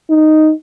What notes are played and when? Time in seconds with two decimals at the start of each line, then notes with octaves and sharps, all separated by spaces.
0.10 D#4